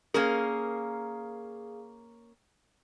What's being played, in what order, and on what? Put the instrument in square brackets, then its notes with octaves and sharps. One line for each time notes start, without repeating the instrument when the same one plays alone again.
[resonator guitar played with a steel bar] A#3 C#4 A#4 [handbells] G#4 F5